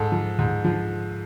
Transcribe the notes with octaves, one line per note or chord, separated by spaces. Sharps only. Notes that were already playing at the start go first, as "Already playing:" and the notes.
Already playing: G#2 A4
F3
G#2
F3